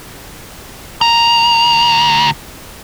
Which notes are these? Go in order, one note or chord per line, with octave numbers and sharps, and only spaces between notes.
D2 A#5